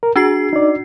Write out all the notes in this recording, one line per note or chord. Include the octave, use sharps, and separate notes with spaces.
A#4
D4 F#4 G#4 C7
D#4 D5